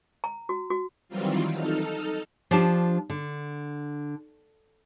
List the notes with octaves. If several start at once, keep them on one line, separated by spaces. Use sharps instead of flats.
A#5
F#4
F#4
D#3 E3 F#3 G3 C4 F4
D#4 A4 F6
F3 D4 F4 G4 A5
D3